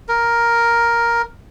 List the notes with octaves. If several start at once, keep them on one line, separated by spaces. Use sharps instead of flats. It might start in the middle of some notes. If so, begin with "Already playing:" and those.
A#4